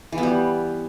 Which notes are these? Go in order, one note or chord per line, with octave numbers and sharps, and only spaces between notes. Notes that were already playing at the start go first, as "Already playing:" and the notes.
E3
B3
G3